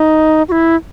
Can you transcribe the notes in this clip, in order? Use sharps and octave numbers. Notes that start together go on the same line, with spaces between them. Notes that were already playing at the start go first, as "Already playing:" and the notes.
Already playing: D#4
F#4
E4